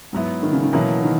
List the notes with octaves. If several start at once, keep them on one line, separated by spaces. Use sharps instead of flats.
G#2 F#3 B3 E4
D#3
C#3
D#3
B2 E3 F#3 A#3 C#4 E4
D#3